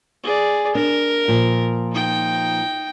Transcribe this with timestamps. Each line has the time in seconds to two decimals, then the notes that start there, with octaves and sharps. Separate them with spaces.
0.23 G#4 D5
0.75 D4 A#4
1.28 A#2 F3
1.92 D#4 G5